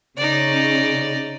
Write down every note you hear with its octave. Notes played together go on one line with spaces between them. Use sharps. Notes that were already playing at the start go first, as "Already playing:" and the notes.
C#3 C#4 D#4 D5